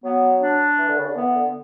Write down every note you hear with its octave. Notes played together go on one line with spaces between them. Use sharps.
F#3 B3
D4
E3
D3
C#3
D3
E3 B3
D3